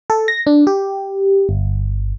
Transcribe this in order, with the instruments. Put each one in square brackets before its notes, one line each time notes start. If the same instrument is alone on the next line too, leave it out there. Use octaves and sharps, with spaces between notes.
[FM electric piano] A4
A#6
D4
G4
G1